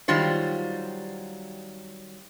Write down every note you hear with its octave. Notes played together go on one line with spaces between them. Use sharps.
D#3 F#3 G3 F4 C5